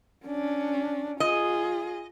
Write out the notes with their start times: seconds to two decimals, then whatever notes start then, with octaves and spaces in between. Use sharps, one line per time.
0.25 C#4 D4
1.20 F4 G#4 D#5